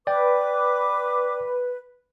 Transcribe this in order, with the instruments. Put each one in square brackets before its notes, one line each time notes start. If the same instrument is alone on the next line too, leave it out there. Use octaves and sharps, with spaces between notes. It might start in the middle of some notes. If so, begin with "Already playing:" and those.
[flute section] B4 [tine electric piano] D5 G5 [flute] D6